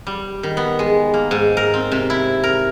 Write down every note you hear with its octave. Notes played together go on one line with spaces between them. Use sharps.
G3
D#3
B3
G#3
A#3
G#2
A#4
C4
C3
E4
A#4